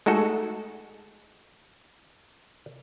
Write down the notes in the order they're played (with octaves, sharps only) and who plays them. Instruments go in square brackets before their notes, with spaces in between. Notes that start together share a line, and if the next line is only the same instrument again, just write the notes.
[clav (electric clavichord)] G#3 A3 D#4 F#4 A4